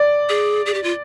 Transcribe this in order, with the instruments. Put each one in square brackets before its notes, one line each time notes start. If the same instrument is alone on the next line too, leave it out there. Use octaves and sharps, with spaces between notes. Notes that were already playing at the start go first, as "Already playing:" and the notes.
Already playing: [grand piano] D5
[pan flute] G#4
G#4
G4
F4